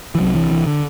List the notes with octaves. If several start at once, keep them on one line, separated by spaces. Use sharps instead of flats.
E3
C2 C3 F#3
E3
E3
D3